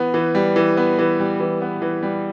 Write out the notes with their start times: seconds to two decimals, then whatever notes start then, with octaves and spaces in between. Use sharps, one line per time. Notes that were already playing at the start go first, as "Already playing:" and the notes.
Already playing: E3 B3
0.14 E3
0.35 G3
0.56 E3
0.77 B3
0.99 E3
1.20 G3
1.40 E3
1.61 B3
1.82 E3
2.03 G3